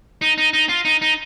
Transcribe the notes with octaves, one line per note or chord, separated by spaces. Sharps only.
D#4
D#4
D#4
F4
D#4
D#4